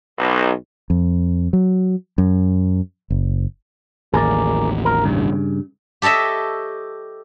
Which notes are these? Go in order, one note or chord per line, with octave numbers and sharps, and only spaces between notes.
B1
F2
F#3
F#2
F#1
A1 D#2 G#4 A#4 D5
A#4
G2 C#3
G4 A4 C#5 D#5 E5